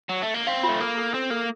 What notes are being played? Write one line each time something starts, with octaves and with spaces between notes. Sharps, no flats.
F#3
A3
A#3
C4 F5
A3 F4
A#3 A4
A4
C4 A4
A#3 A4